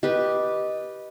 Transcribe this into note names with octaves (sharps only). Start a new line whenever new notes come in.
G4 B4 D#5